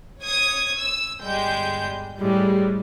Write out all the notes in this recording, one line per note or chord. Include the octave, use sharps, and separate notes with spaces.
C#5 D#6 G#6
E6
G1 G3 G#3 G6
A2 G3 G#3